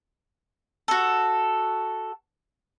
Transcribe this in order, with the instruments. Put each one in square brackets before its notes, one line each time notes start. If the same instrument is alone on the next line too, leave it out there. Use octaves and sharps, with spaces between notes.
[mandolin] F#4 A4